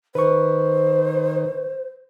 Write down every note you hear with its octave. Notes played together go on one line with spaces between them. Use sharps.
D#3 B4 C5 C#6